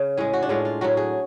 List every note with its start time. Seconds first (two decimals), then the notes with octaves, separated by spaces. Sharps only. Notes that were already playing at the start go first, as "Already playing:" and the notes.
Already playing: C#3
0.17 A2 G#3 G#4
0.33 F#4
0.42 D4
0.49 A2 G#3 F4
0.65 F4
0.81 A2 F#3 F#4
0.97 G#4